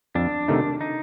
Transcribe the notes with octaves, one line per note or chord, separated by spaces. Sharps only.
F2 D4
C3 D#3 A3 D#4
D#4